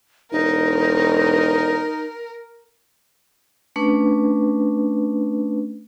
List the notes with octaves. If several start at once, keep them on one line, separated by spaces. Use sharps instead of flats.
E1 D#4 A#4
A3 C#4 D4 B4